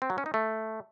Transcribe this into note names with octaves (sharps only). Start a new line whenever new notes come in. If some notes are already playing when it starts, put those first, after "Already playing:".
C4
F#3
C#4
D#4
A3